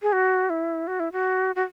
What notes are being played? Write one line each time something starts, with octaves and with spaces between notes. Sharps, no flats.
G#4
F#4
E4
F#4
E4
F#4
F#4